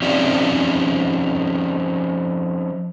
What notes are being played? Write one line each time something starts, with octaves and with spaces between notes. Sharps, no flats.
F3 C4 C#4 D#4 G4 D5